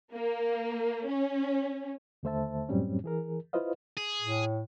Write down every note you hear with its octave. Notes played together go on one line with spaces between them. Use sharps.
A#3
C#4
D#2 D3 A3 C5 E5 A5
F#2 A2 F#3 G3 C4 C#4
E3 G#4 A#4
E4 F4 B4 C5 D#5 F5
G#4
A2